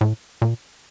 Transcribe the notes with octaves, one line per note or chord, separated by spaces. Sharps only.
A2
A#2